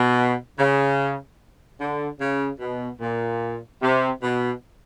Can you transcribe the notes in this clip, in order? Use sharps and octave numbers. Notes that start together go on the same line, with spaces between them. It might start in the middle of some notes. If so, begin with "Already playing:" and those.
Already playing: B2
C#3
D3
C#3
B2
A#2
C3
B2